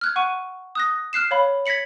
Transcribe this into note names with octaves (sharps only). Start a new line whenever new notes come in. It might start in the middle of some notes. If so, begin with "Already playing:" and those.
F6 F#6 G#6
F#5 C#6 D#7
D#6 F#6 A#6
F6 F#6 C7 E7
C#5 F5 B5
G#6 A#6 B6 C#7 F#7